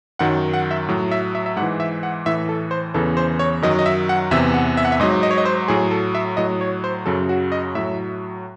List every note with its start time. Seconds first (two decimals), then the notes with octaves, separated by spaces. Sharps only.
0.19 F#2 D#3 F#3 F#5
0.54 F#5
0.71 E5
0.88 A2 F#3
1.11 E5
1.35 E5
1.46 E5
1.56 G#2 F#5
1.62 E3
1.80 E5
2.03 F#5
2.26 A2 E3 E5
2.49 A4
2.71 C5
2.94 E2 C#3 E3 A4
3.17 C5
3.39 C#5
3.62 F#2 D#3 F#3 D#5
3.79 D#5
3.86 E5
4.09 F#5
4.31 E2 C3 E3 E5
4.54 F#5
4.77 E5
4.85 F#5
4.92 E5
5.00 G#2 F#3 D#5
5.23 D#5
5.31 C#5
5.38 D#5
5.45 C5
5.68 A2 F#3 G#4
5.91 A4
6.15 E5
6.37 A2 F#3 D#5
6.61 C#5
6.84 C5
7.06 F#2 C#3 F#3 A4
7.29 F#4
7.52 D#5
7.75 A2 F#3 E5